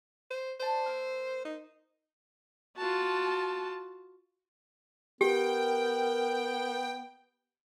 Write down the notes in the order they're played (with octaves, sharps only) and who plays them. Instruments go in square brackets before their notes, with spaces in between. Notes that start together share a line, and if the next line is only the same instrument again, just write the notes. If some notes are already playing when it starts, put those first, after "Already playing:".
[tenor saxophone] C5
[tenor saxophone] C5 [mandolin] D5 A5
[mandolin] A#3 A#4 E6
[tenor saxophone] D#4
[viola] F4 F#4 [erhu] A5
[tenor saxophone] B3 [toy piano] G4 [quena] A#4 [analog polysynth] G5